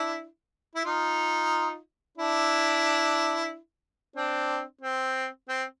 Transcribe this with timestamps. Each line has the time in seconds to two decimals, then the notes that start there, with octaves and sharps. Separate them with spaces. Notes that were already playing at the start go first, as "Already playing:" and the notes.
Already playing: D4 E4
0.75 E4
0.85 D#4 F4
2.17 D4 E4
4.16 C4 D4
4.81 C4
5.48 C4